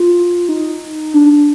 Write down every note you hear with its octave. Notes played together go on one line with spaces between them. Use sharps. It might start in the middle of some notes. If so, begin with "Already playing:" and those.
Already playing: F4
D#4
D4